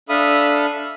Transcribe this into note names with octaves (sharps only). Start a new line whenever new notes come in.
D4 A4 E5 F5 B5 D#6